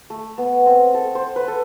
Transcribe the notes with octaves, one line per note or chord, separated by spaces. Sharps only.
A3
B3
C4
A4
C5
B4
A4